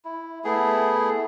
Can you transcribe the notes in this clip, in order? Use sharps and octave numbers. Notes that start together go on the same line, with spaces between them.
E4
A3 B3 E4 G#4